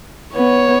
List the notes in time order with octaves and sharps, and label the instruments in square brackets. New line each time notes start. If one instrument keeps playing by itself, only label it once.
[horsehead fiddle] B3 [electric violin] C#5